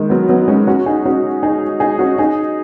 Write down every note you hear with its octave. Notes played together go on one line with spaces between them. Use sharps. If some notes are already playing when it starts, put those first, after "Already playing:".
Already playing: D#3 G#3
F#3 B3
F#3 B3
G#3 C#4
C#4 F#4
D#4 G#4
C#4 F#4
D#4 G#4
D#4 G#4
C#4 F#4
D#4 G#4